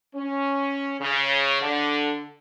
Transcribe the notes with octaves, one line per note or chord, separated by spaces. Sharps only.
C#4
C#3
D3